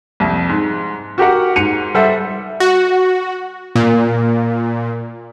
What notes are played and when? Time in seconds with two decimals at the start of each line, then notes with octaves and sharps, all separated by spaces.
0.20 C2 F2
0.49 G#2
1.18 F#4 G4 A#4 F#5
1.56 G#2 C#7 D#7 F7
1.94 G3 A4 C5 E5 F#5
2.60 F#4
3.75 A#2